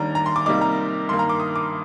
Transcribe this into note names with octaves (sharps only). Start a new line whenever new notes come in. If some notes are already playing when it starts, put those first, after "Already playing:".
Already playing: D#2 D#3 G3 D4 A#5
A#5
C6
D6
C3 G3 A#3 D#4 D6
A#5
G2 D#3 A#3 C6
A#5
D6
D#6
D6